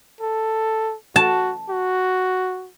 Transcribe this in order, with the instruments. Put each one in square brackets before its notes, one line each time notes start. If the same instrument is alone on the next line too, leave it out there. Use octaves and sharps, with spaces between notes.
[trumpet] A4
[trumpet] F#4 [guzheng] A5
[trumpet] F#4